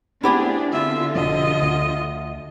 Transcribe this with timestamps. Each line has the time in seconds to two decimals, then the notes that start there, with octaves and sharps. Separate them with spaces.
0.23 A3 B3 C4 D4 E4 G4 G#4
0.72 D3 F4 E5
1.15 F1 B2 F3 D#5
1.61 D2